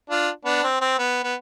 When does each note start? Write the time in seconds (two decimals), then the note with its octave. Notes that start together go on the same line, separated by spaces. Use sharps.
0.10 D4 F4
0.45 B3 D4
0.63 C4
0.81 C4
0.98 B3
1.23 B3